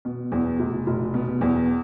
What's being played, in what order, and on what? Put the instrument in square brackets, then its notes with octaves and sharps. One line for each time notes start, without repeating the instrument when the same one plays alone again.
[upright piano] B2
E2
F1
F1
B2
E2